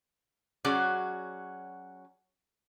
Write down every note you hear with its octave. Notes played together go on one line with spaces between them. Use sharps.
F#3 C#4 F#4 G#4 D5